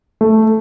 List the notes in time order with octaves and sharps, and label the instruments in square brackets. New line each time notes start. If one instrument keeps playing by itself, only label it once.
[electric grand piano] A3